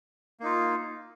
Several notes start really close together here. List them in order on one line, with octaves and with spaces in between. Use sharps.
A#3 D#4 F4